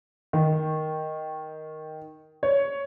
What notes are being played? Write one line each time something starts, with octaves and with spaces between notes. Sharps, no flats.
D#3
C#5